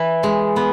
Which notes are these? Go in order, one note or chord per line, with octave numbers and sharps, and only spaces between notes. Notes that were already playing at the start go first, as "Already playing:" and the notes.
Already playing: E3
G#3
B3